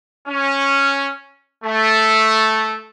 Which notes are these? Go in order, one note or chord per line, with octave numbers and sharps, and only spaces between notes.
C#4
A3